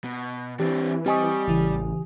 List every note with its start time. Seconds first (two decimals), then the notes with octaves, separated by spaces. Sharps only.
0.04 B2
0.60 E3 C4 D4 G4
1.06 G3 C4 G4 D#5 G#5 C#6 D#6
1.47 A1 C#3 E3